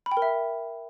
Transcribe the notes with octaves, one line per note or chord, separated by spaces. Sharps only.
B5
G5
A#4
E5